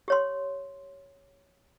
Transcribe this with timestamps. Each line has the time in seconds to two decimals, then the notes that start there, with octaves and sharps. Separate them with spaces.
0.08 G4 C#5 C6